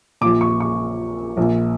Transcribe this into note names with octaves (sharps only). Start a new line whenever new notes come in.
A#1 A#2 D6
C#6
C#6
A#1 A#2